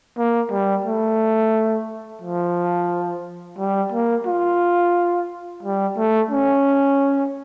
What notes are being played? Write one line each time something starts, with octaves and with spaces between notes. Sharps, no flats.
A#3
G3
A3
F3
G3
A#3
F4
G3
A3
C#4